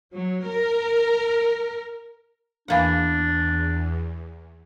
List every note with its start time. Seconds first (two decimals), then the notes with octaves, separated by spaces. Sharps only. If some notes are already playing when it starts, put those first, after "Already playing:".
0.13 F#3
0.47 A#4
2.68 E2 E3 A#3 D4 F#5